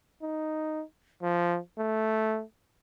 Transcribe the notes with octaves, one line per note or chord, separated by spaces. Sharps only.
D#4
F3
A3